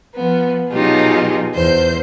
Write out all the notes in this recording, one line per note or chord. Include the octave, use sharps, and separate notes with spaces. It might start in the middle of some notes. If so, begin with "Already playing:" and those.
F3 B3
B2 F#3 D#4 F4 G4 G#4
E2 C5 G6